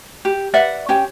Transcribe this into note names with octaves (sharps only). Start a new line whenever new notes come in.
G4
B4 D5 E5 F#5
C#4 G4 C#5 G5